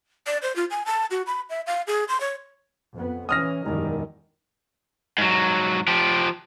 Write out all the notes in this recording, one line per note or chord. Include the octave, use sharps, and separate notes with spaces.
D5
C5
F4
G#5
A5
F#4
B5
E5
F5
G#4
C6
C#5
F2 B3
E3 C#4 D#6 F6 A#6
E1 F#2 D#3 G3
G#2 F#3
F3 G4